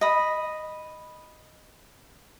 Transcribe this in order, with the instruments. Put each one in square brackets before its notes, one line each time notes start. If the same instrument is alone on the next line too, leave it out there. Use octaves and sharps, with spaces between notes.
[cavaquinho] D#5 B5